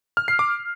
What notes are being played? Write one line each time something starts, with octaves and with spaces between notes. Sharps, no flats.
F6
C7
D6